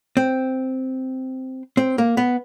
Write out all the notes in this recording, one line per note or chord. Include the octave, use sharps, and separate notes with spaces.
C4
C4
A#3
B3